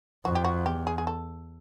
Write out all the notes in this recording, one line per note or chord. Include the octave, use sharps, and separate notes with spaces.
F2 F#4
G4
F#4
E2 G4
G#4
G#4
A4